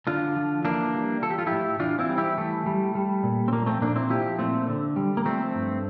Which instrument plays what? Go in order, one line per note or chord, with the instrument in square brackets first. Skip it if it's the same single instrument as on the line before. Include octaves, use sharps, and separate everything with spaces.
[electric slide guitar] D3 D4 F4
F3
E3 A#3 D4
G3
F3 A4
G4
F4
A2 E4 G4
E3 D4 F4
C4 E4
G3
E4 G4
E3 A3
G3
G3
A#2
C4
F3 A#3
A3 C4
A#2 A#3 D4
C4 E4
F3 E4 G4
A#2 A3 C4
D3
G3
A#3
F3 A3 C4
G2